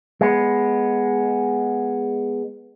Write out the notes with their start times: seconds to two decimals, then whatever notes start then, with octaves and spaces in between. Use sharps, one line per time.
0.21 G#3 B3